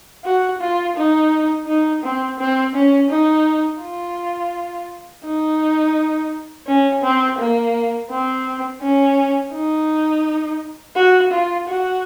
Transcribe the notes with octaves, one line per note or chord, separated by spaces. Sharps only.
F#4
F4
D#4
D#4
C4
C4
C#4
D#4
F4
D#4
C#4
C4
A#3
C4
C#4
D#4
F#4
F4
F#4